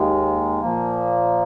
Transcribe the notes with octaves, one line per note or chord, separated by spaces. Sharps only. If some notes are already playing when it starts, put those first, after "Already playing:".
Already playing: D#2 D#3 G#3
A#2 F3 A#3